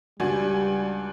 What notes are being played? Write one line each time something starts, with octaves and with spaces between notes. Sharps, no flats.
C#2 G3 D4 F#4 G#5